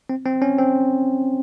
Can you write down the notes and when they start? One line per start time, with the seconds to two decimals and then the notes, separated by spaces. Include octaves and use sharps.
0.09 C4
0.26 C4
0.42 C#4
0.59 C4